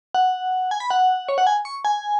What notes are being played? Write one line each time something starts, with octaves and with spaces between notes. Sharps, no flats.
F#5
G#5
B5
F#5
C#5
F#5
G#5
C#6
G#5